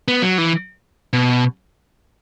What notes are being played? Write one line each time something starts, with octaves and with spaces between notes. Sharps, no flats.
B3
F#3
E3
B2